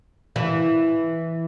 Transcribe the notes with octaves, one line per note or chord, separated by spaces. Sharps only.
E3